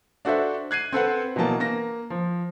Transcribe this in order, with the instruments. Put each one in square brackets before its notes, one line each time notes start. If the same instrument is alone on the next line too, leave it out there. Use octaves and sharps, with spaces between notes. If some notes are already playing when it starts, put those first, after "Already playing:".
[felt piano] D4 F#4 A4 C5 E5
F#6 G#6 C7 D#7
C4 A4 B4 F#5
B2 E3 F#3 A#3 A5
A#3 A#6
F3